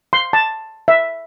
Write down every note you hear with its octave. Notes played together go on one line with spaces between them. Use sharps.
C6
A5
E5